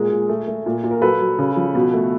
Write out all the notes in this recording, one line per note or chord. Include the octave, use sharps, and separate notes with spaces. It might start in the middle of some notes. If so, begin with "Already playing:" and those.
Already playing: A#2 G#3 G#4 A#4
A#2
A3
A3
A#2
A#2
A#4
F#3 A4 B4
F#3
C#3
F3
B2
A3